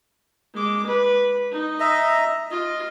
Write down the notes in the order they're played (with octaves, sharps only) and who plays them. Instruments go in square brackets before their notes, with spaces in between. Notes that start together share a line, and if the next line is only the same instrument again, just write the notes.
[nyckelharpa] G#3 D6
B4
D#4
[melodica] D#5 E5 A#5
[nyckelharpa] F4 [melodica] D#5